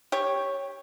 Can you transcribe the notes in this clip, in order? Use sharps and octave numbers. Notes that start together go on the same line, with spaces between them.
G4 C#5